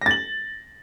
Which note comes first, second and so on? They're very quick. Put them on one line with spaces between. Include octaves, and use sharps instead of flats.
A#6 A6 F#7